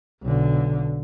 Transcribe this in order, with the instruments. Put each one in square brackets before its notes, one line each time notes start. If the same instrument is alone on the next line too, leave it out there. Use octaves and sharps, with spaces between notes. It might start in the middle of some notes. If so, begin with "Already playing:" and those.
[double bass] B1 D3